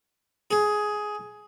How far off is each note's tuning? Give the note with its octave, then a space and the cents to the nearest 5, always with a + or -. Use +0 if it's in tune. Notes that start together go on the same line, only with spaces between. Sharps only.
G#4 +10